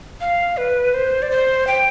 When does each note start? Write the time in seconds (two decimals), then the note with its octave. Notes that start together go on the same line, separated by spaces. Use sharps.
0.21 F5
0.57 B4
0.94 C5
1.22 D5
1.31 C5
1.67 G5